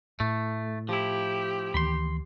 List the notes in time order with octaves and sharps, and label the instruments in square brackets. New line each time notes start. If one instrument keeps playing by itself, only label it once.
[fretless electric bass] A2 [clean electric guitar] A3
[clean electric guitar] F3 E4 [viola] G4
[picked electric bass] D2 D#3 E3 [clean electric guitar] B5 C6